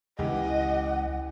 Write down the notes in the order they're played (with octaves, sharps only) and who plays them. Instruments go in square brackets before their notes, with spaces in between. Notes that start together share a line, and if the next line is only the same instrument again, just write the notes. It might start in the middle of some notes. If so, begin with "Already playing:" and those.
[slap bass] C#2 [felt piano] E3 G4 [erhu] D#5 [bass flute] F#5